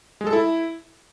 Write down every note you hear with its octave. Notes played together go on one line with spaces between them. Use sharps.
G#3
A4
E4